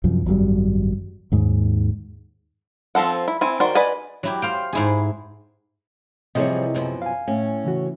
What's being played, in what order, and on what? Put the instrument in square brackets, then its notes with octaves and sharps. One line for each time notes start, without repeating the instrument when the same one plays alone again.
[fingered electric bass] C2 F#2 F3
G#1 F#2 F#3 G3
D#2 G#2
[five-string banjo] F3 C4 A4 F#5
E4
C4 E4 G#5
D#3 F#4 C5 D5
B4 D5 D#5 F#5 G#5
[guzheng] F#3 E4 G4
C5 F5 G5
G#2 E4 G#4
[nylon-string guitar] C3 G#4 C#5 [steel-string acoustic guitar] E3 F3 G3 [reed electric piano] D#5
[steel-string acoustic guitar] F#2 B2 F3
[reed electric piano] F5 G#5
[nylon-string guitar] A2 [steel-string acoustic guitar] C#4
[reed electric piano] C#3 E3 F#4